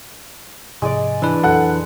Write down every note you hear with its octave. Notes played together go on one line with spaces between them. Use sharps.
G#2 C3 F3 G#3 G#4 D5
E3 D4 B4
F2 A#2 F#3 A4 F#5 F#6